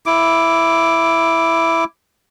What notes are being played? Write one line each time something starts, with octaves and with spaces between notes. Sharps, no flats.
E4 D6